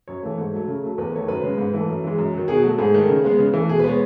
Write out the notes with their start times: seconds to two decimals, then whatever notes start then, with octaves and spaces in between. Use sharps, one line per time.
0.08 F#2 C#5
0.23 E3 A3
0.38 G#2
0.53 F#3 A3
0.67 C#3
0.84 F#3 A3
0.98 E2 B4
1.13 D#3 A3 C#5
1.28 F#2 B4
1.43 C#3 G#3
1.58 G#2
1.73 E3 A3
1.89 F#2
2.04 E3 G#3
2.18 F#2
2.34 D#3 F#3
2.48 B2 G#4
2.63 F#3 A3 F#4
2.79 G#2 G#4
2.94 D#3 A3
3.08 C#3
3.24 G#3 B3
3.39 C#3
3.54 E3
3.59 A3
3.69 B2 G#4
3.80 B4
3.84 G#3 B3 C#5